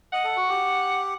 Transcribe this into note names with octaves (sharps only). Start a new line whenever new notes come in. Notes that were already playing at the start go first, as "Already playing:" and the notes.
D#5 F#5
A4
F#4
G4